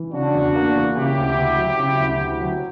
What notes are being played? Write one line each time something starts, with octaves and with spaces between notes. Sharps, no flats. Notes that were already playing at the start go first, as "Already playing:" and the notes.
Already playing: E3
C#3 D4 F#4
E2
A#3
E3
C#3 E4 G4
D2
D2
F#3
C#3
D2
D2
F#3